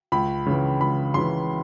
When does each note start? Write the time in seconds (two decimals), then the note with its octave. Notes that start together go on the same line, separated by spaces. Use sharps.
0.12 C#2 B5
0.46 C#3 E3
0.81 C#2 B5
1.14 C#3 E3 C6